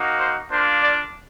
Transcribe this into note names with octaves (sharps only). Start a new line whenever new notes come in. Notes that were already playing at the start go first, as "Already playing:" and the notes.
Already playing: A#3 D#4 F#4
C5
A#3 D4 F4 C5
D5